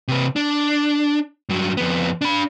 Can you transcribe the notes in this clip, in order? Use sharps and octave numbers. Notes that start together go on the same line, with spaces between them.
C3 B4
D4
G2 F#3
F2 B3
D4 B5